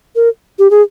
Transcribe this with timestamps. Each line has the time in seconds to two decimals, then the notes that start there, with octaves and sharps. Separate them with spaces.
0.16 A#4
0.59 G4
0.71 G#4